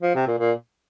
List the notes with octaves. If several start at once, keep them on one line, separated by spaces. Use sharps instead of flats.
F3
C3
A#2
A#2